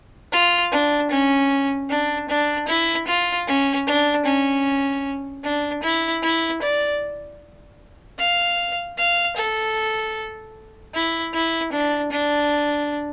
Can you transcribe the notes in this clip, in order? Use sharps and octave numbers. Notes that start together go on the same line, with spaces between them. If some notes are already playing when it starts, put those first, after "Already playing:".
F4
D4
C#4
D4
D4
E4
F4
C#4
D4
C#4
D4
E4
E4
D5
F5
F5
A4
E4
E4
D4
D4